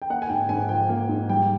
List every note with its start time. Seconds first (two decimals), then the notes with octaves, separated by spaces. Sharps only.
0.02 G5
0.10 A#3 F#5
0.22 G#5
0.29 G#2 G5
0.49 G#2 G#5
0.69 F3 G5
0.89 A#3
1.09 G#2
1.29 G3 G5